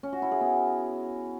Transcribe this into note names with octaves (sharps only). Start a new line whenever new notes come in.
C#4
F#4
E4
G#4
B3